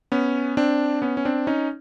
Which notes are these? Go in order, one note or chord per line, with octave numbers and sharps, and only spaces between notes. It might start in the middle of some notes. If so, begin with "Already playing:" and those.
B3 C#4
C4 D4
B3 C#4
C#4
C4 D4
C#4 D#4